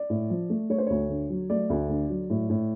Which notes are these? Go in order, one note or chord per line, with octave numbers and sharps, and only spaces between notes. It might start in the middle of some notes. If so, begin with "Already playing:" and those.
Already playing: D5
A2
F3
A3
A3 C#5
C5
D2 C#5
D3
F#3
A3 D5
D2
D3
F#3
A2
A2